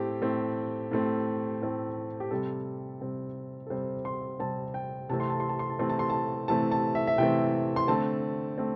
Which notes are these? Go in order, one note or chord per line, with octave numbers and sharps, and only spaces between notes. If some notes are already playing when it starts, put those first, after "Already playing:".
Already playing: A2 A3 C4 G4
A2 A3 C4
A2 A3 C4
A2 A3 C4
G4
C3 G3 C4 A4
C3 G3 C4
A4
C3 G3 C4 C5
C6
C3 G3 C4 A5
G5
C3 E3 A3 C4 A5
C6
A5
C6
A5
C6
A5
C3 E3 A3 C4 C6
A5
C6
A5
C3 E3 A3 C4 A5
A5
E5
E5
C3 E3 A3 C4 G5
C6
D3 A3 C4 A5
A3 C4